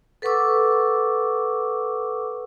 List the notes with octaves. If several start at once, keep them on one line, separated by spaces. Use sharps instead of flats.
A4 B4 F#5 C#6 D6 E6